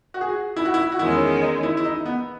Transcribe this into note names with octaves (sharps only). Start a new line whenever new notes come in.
F#4
G#4
F#4
E4
F#4
E4
F#4
E2 D#3 G#3 C#4 E4
D#4
E4
E4
D#4
B3